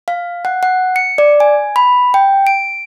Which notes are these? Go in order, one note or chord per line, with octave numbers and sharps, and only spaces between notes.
F5
F#5
F#5
C#7
D5
G#5
B5
G5
D7